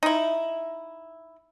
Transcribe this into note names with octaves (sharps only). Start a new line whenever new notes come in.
D#4 E4